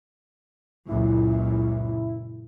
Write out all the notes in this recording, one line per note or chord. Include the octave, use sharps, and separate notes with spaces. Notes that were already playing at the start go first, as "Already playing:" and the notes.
C#2 F#2 A#2 E4